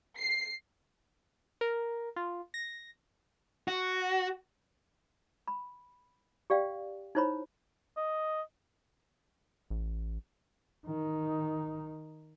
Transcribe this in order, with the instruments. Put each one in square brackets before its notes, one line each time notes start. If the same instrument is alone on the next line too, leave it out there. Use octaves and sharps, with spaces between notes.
[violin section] C7
[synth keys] A#4
F4
A#6
[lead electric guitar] F#4
[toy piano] B5
G4 D5 F5 G5
D#4 E4 C5 C#5 B5
[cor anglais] D#5
[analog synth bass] A1
[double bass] D#3 D#4